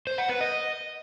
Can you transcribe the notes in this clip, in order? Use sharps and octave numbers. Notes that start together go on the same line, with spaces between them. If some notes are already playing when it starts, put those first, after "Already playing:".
C5
F#5
B4
D#5